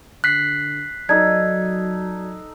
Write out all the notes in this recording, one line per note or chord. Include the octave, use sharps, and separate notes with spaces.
D3 F#6 B6 C7
F#3 D#4 A4 D5 G#6